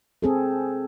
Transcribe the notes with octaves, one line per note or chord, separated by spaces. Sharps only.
C4 G#4 A4